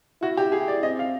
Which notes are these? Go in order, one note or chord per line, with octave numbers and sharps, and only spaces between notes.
E4 F#4
G4
E4 G#4
D5
C4 D#5
F5